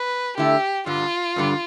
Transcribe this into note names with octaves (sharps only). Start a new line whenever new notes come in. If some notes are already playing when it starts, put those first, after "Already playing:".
Already playing: B4
D3 A3 E4 G4 A4
G2 D3 G3 F4
G2 D3 G3